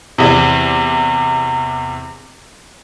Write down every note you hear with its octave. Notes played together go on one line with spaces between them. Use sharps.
E2 C3